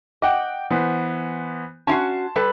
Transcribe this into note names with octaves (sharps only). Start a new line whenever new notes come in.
D#5 F#5 G5 D6
E3 B3 C5
C#4 E4 F#4 A5 C6 C7
G3 A4 B4